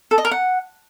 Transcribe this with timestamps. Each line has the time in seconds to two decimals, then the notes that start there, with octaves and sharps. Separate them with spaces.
0.11 A4
0.18 D#5
0.25 A#4
0.31 F#5